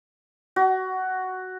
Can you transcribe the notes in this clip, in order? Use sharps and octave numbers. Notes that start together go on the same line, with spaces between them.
F#4